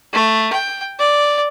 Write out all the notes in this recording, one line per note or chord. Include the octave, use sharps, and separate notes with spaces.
A3
G5
D5